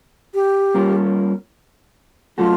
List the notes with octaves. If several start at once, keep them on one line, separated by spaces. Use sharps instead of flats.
G4
G3 A#3 C#4 F4 A#4
F#3 A3 C#4 F4 F#4 A4